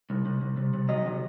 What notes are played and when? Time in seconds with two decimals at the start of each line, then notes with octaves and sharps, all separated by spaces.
0.10 C2
0.26 C2
0.42 C2
0.57 C3
0.74 C3
0.89 F#3 D#5
1.06 C3